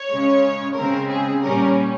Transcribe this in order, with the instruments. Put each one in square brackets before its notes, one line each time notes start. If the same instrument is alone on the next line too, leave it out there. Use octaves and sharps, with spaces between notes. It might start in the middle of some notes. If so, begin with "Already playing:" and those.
Already playing: [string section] C#5
C#3 G#3 C#4
C#3 G#3 C4 A#4
G#4
A#2 G3 C#4 A#4